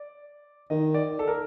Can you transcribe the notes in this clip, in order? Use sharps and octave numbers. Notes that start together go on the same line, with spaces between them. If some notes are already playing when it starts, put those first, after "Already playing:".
Already playing: D5
D#3 D#5
D5
A4
A#4